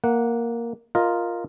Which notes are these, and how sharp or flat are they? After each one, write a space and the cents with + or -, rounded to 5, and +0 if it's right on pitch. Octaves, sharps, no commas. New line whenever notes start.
A#3 +0 F#5 -10
F4 +0 A#4 +0 D#5 +0